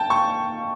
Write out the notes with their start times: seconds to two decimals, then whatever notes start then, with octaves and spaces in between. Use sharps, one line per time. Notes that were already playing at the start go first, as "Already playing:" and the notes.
Already playing: G5 A5
0.10 C#6